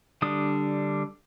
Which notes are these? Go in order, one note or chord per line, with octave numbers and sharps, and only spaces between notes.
D3 G3 D4 D#6